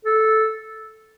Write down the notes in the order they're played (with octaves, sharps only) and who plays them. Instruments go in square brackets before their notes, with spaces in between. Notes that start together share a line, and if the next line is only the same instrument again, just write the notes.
[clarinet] A4